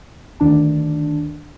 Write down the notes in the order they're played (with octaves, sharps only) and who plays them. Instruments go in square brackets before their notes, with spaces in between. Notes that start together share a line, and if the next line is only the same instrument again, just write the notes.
[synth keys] D2 D#3 D4 A5